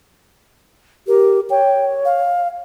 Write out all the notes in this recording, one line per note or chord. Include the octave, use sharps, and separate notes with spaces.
G4 A#4
C#5 G5
F5